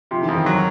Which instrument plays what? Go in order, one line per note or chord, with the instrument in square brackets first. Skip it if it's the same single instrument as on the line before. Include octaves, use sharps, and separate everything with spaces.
[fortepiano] C3 [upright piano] F3
[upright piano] E3
[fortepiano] F2
[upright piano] D#3
[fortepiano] F#3